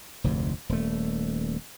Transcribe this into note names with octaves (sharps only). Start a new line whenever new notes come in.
F1 D2 G#2
D#1 A3